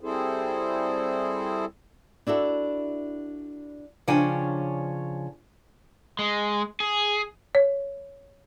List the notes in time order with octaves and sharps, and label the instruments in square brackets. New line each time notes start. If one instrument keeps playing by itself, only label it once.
[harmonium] G3 C4 E4 G#4 A4 C5
[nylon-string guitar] D4 E4 F#4 A4
C#3 F3 C#4 D4 G5 G#5
[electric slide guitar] G#3
G#4
[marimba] C#5